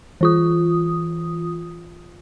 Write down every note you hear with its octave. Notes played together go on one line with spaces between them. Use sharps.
E3 F4 D#6